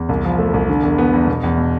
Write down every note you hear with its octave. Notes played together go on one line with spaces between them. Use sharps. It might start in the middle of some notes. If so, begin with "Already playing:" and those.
Already playing: E2
C2
F3
A3
C2
D3
E2
B3
E2
B2
E2
B2